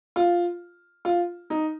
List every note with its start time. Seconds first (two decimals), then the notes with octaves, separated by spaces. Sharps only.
0.16 F4
1.05 F4
1.50 D#4